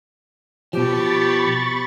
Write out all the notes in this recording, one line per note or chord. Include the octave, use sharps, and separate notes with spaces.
B2 F3 G4 B5 C#6 A6